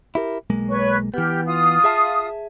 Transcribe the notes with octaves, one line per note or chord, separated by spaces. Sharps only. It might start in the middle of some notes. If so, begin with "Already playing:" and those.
E4 G4 A#4
B1 G#3 A#3
B4 C#5 C#6
E3 B3 G4 F6 G6
F4 F5 D#6
G#4 E5 A5